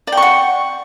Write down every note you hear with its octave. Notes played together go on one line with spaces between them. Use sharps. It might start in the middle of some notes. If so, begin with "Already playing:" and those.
D5 F#5 G5 C#6